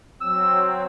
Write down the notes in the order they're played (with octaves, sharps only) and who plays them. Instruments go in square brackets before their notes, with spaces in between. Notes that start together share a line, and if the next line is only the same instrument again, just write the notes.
[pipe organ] F#3 C4 [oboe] E6